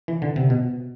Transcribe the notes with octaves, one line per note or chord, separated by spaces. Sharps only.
E3
D3
C3
B2